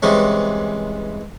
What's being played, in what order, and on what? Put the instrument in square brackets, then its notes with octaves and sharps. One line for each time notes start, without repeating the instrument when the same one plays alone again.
[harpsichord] G2 C3 E3 G#3 C#4